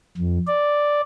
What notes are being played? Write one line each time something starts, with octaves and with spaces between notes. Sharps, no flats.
F2
D5